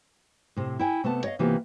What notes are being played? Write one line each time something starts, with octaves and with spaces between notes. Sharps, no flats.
A2 C3
E4 G5 G#5
C3 A3 B3 A5
C#5 D#5 F5
C3 E3 A#3 B3 F4 G4